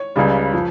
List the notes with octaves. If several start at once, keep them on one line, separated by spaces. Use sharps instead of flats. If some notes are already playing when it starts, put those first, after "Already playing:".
Already playing: C#5
C#2 C#3 G3
F3